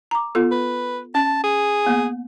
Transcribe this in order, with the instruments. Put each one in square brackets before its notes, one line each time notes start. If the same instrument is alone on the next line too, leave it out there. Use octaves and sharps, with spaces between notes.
[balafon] A#5 D6
B3 F4 A4
[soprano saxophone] B4
[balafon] C#4 [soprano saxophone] A5
[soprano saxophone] G#4
[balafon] A#3 B3 G#5